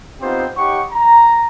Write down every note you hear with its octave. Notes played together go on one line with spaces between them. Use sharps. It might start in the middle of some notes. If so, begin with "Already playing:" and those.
B3 C4 D#4 F4 G4 C5
D#4 G4 C#5 F#5 C#6
A#5